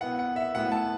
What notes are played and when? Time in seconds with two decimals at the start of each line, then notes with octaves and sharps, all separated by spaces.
0.01 B2 B3 E4 F#5
0.19 F#5
0.36 E5
0.54 A2 F#3 B3 E4 F#5
0.72 A5